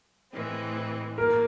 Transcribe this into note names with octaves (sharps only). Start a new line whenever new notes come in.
A2 E3 G#3 C4
A#3 A#4